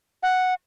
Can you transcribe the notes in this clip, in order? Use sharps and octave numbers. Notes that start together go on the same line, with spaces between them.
F#5